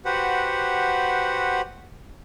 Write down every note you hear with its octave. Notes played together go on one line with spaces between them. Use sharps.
F#4 G4 B4 C5 F#5